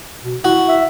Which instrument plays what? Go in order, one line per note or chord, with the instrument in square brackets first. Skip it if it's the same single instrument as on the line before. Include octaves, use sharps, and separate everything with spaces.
[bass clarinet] B2
[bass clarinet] E4 [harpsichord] F#4
[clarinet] E5